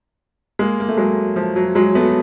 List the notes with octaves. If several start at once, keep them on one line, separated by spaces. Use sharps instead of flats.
G#3 A#3
A#3
A3
F#3 G#3
F3
F#3
F#3 G#3
A3 B3